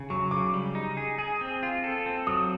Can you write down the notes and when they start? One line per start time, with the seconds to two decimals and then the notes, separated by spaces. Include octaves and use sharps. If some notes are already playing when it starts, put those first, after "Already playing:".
Already playing: C#3
0.10 F#3 C#6
0.31 C#3 D6
0.54 G3
0.75 D#4
0.97 G#4
1.18 G#4
1.41 C4
1.63 F4
1.84 A4
2.06 C4
2.27 F#3 D#6